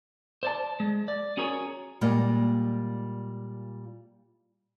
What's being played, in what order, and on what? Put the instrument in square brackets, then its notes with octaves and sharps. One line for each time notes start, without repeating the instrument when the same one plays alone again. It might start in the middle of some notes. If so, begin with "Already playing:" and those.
[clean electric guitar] C5 D5 A5
G#3
D5
C#4 F#4 G#4 A#4 C#5
[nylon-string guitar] A#2 G3 G#3 A#3